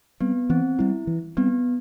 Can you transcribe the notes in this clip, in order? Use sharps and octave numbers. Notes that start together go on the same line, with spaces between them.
G3 B3 C4
E3 C4
G3 C4 E4
E3
G3 B3 C4